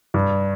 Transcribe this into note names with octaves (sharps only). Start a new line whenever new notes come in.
G2